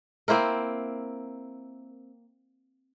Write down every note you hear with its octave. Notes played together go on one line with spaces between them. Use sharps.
A#3 C4 E4 A#4